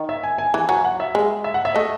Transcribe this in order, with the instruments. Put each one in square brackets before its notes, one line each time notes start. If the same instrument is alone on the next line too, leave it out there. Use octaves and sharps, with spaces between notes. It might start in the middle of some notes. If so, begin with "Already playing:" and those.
Already playing: [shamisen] D#3
[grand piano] E5
G#5
G#5
[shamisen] E3 [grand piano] G#5
[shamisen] F#3 [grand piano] G#5
[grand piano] F#5
E5
[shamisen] G#3 [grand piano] D#5
[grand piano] E5
F#5
E5
[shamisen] A3 [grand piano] D#5